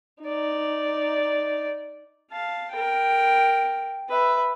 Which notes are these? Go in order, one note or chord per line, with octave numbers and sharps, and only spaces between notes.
D#4 D5
F5 A5
A#4 G5
B4 E5